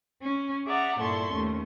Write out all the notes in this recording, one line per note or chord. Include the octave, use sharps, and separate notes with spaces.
C#4
G#4 D5 E5 F#5 A#5
G2 A#2 E4 A4 C6 C#6
D#2 A3 C#4